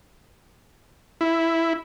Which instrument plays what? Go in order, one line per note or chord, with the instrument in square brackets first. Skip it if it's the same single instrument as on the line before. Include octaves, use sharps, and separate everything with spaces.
[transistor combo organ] E4